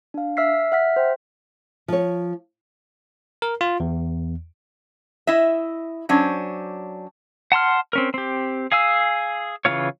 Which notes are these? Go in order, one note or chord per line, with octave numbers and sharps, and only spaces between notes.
D4 F5
E5 E6 F6 B6 C7
E5 F#5 F6 B6
C5 G5
F3 C#5
A#4
F4
E2
E4 D#5 E5
F#3 C#4 D4 C5
F#5 A5 C6 F6
C4 C#4 A#4
C4 G4
G#4 F5 G#5 E6
C#3 E3 A#3 F4 C#5